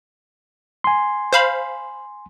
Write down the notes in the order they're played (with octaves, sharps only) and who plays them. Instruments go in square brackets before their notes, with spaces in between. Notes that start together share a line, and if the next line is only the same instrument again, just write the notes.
[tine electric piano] G#5 C6
[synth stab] C5 F5 B5